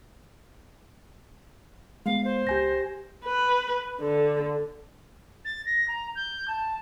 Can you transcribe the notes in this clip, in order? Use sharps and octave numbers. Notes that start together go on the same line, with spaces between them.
G#3 B3 F5
C5
C#2 G4 G#5 G6 A#6
B4
D3
A6
A#6
A#5
G6
A5